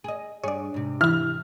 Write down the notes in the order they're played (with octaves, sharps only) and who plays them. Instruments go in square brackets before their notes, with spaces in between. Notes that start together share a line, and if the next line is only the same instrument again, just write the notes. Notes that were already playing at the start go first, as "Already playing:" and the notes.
[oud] G#4 D#5
[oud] G2 G#4 [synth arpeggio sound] C#5 D5
[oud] G#2 C3
[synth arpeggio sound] E3 E4 [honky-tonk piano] F6